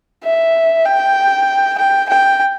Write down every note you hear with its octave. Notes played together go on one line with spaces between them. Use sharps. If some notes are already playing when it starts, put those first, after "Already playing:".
E5
G5
G5
G5